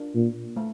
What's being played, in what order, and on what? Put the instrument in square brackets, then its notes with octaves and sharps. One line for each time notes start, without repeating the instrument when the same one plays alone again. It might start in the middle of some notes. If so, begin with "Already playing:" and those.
Already playing: [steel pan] D4 F4 A#4 D5
[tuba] A#2
[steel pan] A3